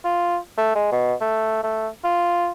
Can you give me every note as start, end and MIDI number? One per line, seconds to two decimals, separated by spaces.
0.04 0.37 65
0.58 0.71 57
0.75 0.90 56
0.92 1.14 47
1.21 1.63 57
1.63 1.88 57
2.04 2.50 65